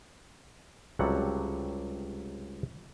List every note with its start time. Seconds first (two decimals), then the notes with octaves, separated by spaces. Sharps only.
0.99 C#2 C3 F#3 G3 A4 F#5